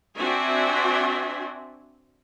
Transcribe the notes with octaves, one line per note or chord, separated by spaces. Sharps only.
C4 D4 F#4 E5 G#5